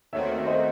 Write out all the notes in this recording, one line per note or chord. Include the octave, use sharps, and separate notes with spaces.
D#2 D#3 A3 C4 F#4 C#5 E5
E5
C5 D#5